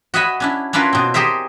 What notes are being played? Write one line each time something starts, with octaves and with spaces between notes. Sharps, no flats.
F#4 D#5 E5 F#5 G#5 B5
C#4 D4 E4
C#4 D4 E4 F4 A#4 B4
B2 C4
G4 G#4 A#4 C5 E5